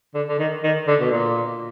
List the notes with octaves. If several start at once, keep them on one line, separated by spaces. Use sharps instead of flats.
D3
D3
D#3
D#3
D3
B2
A#2